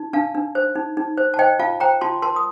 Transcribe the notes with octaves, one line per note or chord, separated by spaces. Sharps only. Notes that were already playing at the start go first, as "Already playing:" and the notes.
Already playing: D#4
D4 F5 A5
D4
C5
D#4
D#4
C5
A5
C5 D#5 G5
F4 F5 A5
C5 G5 A#5
F4 A5 C6
A#4 A5 C6
D#6